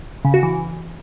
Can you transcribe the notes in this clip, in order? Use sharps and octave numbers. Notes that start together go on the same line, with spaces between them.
C#3
F#4
E3